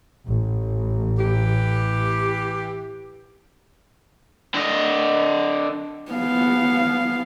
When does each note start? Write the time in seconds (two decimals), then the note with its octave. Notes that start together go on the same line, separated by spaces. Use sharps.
0.28 A1
1.18 E3 G4
4.55 D3 D#5
6.12 B3 F5